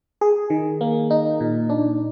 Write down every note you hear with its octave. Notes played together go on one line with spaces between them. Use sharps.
G#4
D#3
A#3
D#4
A#2
D4